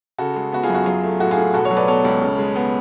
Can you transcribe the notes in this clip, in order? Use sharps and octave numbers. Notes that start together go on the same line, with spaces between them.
C#3 F#4 A4
G#3
B3 F#4
F4 G#4
F#2
F#4
F#3 F4 G#4
A3
A2 F#4
F4 G#4
A2
B2 F#4 A4
A4 C#5
F#3
B4 D5
B3 A4 C#5
C#2
C#3
G#3
B3